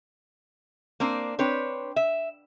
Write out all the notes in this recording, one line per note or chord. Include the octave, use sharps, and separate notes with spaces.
A#3 C4 D4
C4 D4 B4 C#5
E5